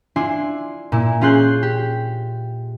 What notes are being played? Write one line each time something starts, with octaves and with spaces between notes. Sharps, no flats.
D4 E4 F4 G#5 C6
A#2 E4
C#4 F4 G#4 C6 F#6 G6
G4